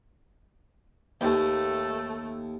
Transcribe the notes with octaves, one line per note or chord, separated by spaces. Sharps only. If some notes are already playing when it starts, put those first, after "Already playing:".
D#2 A3